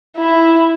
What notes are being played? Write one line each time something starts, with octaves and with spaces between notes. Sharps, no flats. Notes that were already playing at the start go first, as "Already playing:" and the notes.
E4